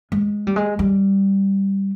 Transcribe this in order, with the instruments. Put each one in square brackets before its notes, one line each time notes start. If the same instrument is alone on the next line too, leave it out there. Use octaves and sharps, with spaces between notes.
[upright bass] G#3
G3
G#3
G3